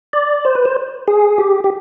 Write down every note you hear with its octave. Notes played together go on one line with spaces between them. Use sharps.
D5
C5
B4
C5
G#4
G4
G4